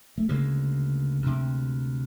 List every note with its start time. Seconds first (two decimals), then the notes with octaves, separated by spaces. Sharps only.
0.18 A3
0.28 D2 C#3 G#3 A#3
1.22 D2 C3